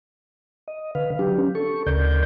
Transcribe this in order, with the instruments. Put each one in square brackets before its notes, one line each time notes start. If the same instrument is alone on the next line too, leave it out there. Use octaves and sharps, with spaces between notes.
[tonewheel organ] D#5
D3 B4 F5
F#3 D4 G4
C#4
A4 C#6
D2 C#3 A#4 D5 G6